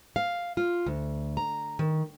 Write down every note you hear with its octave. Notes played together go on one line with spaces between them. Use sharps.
F5
F4
D2
A#5
D#3